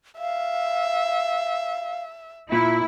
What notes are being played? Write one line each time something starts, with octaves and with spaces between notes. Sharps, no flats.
E5 F5
A#2 E4